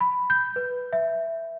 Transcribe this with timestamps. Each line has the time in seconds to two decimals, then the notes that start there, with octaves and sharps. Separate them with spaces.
0.01 B5
0.30 G6
0.56 B4
0.93 E5